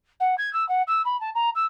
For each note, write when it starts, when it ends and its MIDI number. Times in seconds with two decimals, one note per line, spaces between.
0.20 0.35 78
0.38 0.52 92
0.53 0.66 88
0.68 0.82 78
0.87 1.02 88
1.05 1.19 83
1.20 1.30 81
1.35 1.49 82
1.55 1.65 88